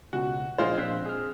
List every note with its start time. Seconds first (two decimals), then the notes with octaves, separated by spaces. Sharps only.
0.13 C#2 B2 F#4
0.58 A#1 G#3 F4 C5
0.78 A#1 C4 F#6 B6
1.06 G#4 F6